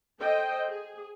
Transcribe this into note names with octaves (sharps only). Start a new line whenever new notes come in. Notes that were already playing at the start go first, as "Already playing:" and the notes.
A4 C5 D#5 G5
G#4